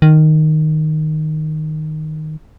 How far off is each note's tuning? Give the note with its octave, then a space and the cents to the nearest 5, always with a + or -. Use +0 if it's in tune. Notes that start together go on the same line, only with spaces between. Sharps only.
D#3 -5